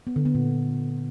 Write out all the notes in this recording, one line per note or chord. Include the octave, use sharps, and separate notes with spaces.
B3
D3
B3
A#2